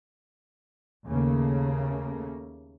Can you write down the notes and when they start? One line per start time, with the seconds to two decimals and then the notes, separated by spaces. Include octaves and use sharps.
1.07 D#2 C#3 A3 A#3